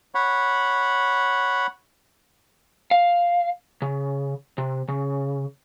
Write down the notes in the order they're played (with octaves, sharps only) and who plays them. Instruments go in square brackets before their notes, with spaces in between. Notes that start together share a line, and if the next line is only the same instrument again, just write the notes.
[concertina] C#5 F#5 B5
[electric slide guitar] F5
C#3
C3
C#3